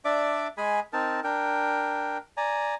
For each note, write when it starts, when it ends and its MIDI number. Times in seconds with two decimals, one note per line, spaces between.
0.05 0.48 62
0.05 0.48 74
0.05 0.48 76
0.05 0.48 86
0.57 0.80 56
0.57 0.80 68
0.57 0.80 80
0.57 0.80 83
0.93 1.20 60
0.93 1.20 63
0.93 1.20 70
0.93 1.20 81
1.24 2.18 62
1.24 2.18 70
1.24 2.18 79
2.37 2.75 74
2.37 2.75 80
2.37 2.75 82